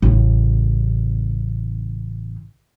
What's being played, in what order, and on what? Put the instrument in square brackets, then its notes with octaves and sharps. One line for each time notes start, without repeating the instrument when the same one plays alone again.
[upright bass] A1 C#3